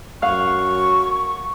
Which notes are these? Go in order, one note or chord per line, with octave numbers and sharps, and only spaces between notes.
F#2 F5 F#5 C#6 F6